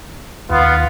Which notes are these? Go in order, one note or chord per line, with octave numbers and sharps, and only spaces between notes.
D#2 B3 F4